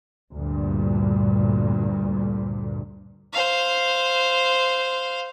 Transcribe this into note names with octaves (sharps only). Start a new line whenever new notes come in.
D2 G2 A#2
C5 F5